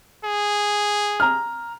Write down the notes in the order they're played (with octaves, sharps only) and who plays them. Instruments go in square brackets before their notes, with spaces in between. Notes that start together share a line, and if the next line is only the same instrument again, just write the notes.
[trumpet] G#4
[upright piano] A#5 F6